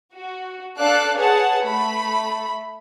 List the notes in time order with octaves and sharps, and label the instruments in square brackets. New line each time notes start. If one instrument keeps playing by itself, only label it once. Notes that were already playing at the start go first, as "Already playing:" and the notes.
[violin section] F#4
D4 A4 D5 F5 F#6
G#4 B4 C#5 F#5 A5
A3 B5